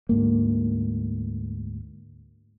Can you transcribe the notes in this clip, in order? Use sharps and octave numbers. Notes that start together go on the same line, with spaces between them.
D2 G#2 A#3